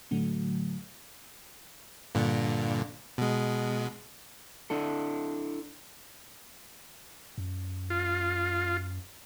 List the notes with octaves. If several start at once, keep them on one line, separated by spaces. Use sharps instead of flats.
A2 D3 F#3 A3
G2 A#2 D3
B2 G#3
D4 E4 A4
F#2
F4